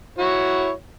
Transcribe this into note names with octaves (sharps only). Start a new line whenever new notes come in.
E4 F#4 C#5